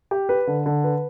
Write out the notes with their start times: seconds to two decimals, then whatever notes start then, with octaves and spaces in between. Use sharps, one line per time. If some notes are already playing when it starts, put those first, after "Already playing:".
0.11 G4
0.29 B4
0.47 D3
0.66 D3
0.84 B4